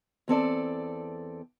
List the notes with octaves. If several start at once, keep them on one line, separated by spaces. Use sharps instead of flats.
E2 C4 A4 D5